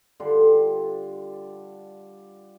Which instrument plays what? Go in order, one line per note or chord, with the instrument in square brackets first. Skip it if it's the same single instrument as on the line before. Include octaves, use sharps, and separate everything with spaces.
[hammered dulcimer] D3 G3 F4 C6